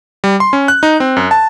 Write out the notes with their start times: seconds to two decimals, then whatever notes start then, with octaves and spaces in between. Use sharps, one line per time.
0.24 G3
0.40 C6
0.53 C#4
0.68 F#6
0.83 D#4
1.00 C4
1.17 F#2
1.31 A5